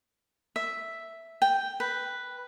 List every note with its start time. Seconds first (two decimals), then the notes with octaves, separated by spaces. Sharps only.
0.56 E5
1.42 G5
1.80 B4